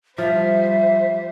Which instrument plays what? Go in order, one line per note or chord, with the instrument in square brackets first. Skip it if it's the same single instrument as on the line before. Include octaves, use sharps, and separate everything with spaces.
[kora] F3 [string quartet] G3 C5 [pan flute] E5